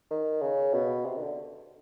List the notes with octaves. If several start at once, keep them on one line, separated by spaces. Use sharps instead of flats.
D#3
C#3
B2
C3
D#3
D3